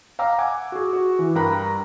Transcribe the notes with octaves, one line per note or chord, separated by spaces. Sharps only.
F5 G5 A#5 D6 E6
F#5 G#5 D6
F#4 G#4
F#4
E3
G2 A#4 G5 A#5 B5 F#6